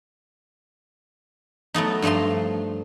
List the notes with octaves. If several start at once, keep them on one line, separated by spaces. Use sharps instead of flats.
F#3 A3 B3 D#4
G2 F3 A3 A#5 C6